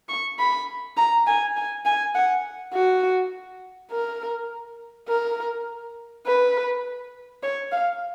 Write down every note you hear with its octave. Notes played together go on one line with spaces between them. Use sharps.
C#6
B5
A#5
G#5
G#5
G#5
F#5
F#4
A#4
A#4
B4
C#5
F5